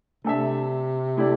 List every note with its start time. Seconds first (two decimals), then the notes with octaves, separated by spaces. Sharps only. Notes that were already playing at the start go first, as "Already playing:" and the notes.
0.24 C3 A3 D4 A4 E5
1.17 A3 E4 G4 D5